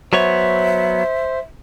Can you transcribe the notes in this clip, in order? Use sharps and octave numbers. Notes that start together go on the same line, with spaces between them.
F#3 B3 C5 C#5 E5